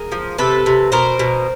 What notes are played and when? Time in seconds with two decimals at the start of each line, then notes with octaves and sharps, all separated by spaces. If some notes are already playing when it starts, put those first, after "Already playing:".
Already playing: G#4 A#4
0.12 F3
0.38 C3 A4 B4
0.66 C3
0.92 B2 A#4 C5
1.19 B2